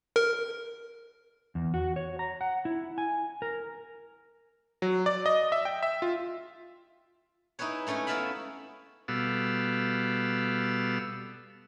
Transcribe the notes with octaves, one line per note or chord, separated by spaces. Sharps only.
A#4
E2
F#4
C#5
A#5
F#5
E4
G#5
A#4
F#3
D5
D#5
E5
G5
E5
F4
D#4 E4 G#4 B4 C#5
G#3 A3 C#4 D#4 E4
B3 E4 A4 E5 F5 B5
B2 G3 B3 A4 F5 E6